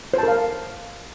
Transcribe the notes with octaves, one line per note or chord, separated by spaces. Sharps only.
A#4 C5 F5 A5